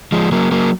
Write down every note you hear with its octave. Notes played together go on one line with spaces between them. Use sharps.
F3 G#3
F#3 A#3
F#3 A#3